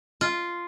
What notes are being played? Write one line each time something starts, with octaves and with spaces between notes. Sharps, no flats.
F4